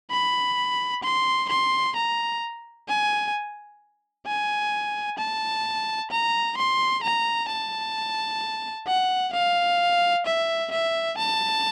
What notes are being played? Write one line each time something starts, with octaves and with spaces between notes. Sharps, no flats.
B5
C6
C6
A#5
G#5
G#5
A5
A#5
C6
A#5
A5
F#5
F5
E5
E5
A5